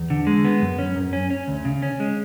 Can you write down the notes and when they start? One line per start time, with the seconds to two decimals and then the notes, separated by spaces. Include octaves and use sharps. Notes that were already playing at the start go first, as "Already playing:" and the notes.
Already playing: E2
0.10 D3
0.27 G#3
0.45 B3
0.62 F#2
0.79 C#4
0.96 F#2
1.13 C#4
1.30 C#4
1.48 D2
1.65 C#3
1.82 C#4
2.00 G#3